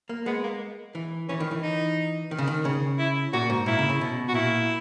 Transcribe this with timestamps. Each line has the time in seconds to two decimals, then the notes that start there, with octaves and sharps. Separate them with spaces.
0.09 A#3
0.26 G#3 B3
0.43 A#3
0.95 E3
1.28 E3 C#4
1.40 D#3
1.51 E3
1.63 D#4
2.31 D#3
2.38 C#3
2.48 D#3
2.65 C#3
2.99 E4
3.33 A#2 F#4
3.50 G#2
3.66 A#2 E4
3.79 C#3
3.89 C#3
4.01 B2
4.28 F#4
4.34 A#2 E4